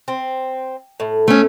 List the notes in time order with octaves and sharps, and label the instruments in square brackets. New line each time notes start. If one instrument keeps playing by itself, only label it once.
[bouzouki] C4
A2
[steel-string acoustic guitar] A3 C#4